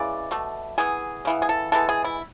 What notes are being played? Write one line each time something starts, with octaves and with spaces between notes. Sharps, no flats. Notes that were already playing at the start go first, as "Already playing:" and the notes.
Already playing: C#3 E3 G#3 D5
B2 A3
E3 B3 G#4
C#3 E3 B3
G#4
A4
E3 G#3 B3 A4
G#4
E4